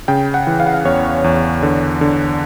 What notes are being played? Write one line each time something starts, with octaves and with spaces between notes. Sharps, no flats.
C#3 G5
F#5
E3
F5
F#5
F5
E2 C#5
E2
D3
D3